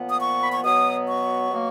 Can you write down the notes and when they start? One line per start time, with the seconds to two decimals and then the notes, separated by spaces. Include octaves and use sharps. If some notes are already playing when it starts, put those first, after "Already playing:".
Already playing: A#2 F3 B3
0.10 D#6
0.21 C#6
0.42 B5
0.53 C#6
0.63 B2 F#3 B3 D#6
1.07 C#6
1.50 B2 F#3 A#3